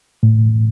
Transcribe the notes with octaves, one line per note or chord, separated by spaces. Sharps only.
A2